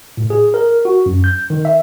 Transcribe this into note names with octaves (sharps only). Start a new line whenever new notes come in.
A2
G#4
A#4
F#4
F#2
G6
D#3
E5